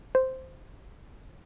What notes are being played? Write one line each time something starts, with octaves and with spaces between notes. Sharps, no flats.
C5